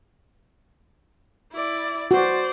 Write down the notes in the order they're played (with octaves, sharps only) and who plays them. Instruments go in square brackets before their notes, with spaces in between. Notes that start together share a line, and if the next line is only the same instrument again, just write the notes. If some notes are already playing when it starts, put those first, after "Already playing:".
[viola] E4 D5
[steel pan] F#4 [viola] C5 D5